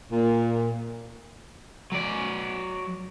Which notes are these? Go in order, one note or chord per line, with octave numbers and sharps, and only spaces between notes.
A#2
F#3 D5